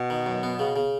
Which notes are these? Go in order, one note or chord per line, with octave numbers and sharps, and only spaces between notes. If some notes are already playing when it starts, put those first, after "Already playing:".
Already playing: B2
D#3
F#2
B3
C#3
C#3